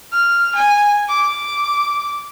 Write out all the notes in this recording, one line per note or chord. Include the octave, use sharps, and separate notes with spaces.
F6
G#5
D6